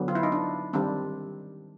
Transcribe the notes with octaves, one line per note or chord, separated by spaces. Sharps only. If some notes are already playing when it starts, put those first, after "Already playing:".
Already playing: D3 F#3 B3
F4
E4
D#4
D4
D#3 G3 C4 D4